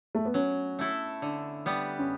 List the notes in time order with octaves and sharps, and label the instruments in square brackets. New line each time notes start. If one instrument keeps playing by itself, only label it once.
[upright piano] A3
B3
[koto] F#3 [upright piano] C#4
[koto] A3 E4 A4
D3
G3 B3
[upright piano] C#4